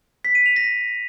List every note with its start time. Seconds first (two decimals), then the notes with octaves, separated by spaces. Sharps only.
0.25 B6
0.35 D#7
0.46 F7
0.56 A#6